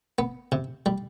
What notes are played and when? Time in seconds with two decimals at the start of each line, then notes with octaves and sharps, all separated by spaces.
0.19 B3
0.52 C3
0.86 G3